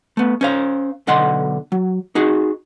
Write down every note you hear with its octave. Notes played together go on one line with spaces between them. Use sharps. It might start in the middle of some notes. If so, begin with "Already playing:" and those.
A3 B3
C#4 C5 F5
B1 D3 D#5 F#5 C6
F#3
D#4 F#4 G#4